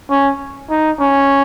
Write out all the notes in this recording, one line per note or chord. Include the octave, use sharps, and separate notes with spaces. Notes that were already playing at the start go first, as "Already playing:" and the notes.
C#4
D#4
C#4